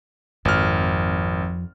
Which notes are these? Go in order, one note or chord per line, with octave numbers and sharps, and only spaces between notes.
G#1 F2 F6